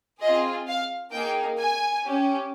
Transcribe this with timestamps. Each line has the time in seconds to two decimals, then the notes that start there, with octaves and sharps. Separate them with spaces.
0.21 C4 F4 G#4 D#5
0.68 F5
1.13 A#3 D#4 G#4 G5
1.59 G#5
2.04 C#4 G4